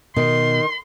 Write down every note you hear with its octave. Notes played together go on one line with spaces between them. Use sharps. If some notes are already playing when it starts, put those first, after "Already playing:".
B2 D#3 C6